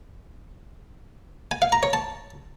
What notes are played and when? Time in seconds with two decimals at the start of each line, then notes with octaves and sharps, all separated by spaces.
1.51 G#5
1.62 F5
1.72 A#5
1.83 C#5
1.93 A5